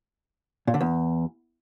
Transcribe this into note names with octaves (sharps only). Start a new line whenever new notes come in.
A#2
D3
E2